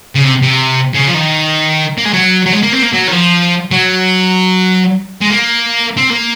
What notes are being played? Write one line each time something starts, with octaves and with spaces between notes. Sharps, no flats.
C#3
C3
C3
C#3
F3
D#3
A#3
G#3
F#3
F#3
G#3
A#3
C4
A#3
F#3
D#3
F3
F#3
G#3
A#3
C4
A#3